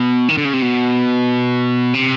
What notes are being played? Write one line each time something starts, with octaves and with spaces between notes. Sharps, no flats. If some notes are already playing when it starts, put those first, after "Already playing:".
Already playing: B2
D#3
D3
C#3
C3
B2
C3